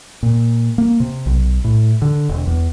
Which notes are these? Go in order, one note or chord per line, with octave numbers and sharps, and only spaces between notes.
A#2
A#3
C3
B1
A2
D3
E1
E2